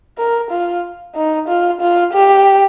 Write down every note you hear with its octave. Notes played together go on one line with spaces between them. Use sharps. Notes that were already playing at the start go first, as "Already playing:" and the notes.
A#4
F4
D#4
F4
F4
G4